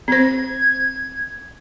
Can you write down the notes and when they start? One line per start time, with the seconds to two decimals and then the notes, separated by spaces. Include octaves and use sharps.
0.08 C4 C5 G#6